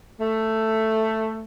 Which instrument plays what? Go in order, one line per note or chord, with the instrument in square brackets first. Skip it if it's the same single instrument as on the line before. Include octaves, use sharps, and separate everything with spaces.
[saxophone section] A3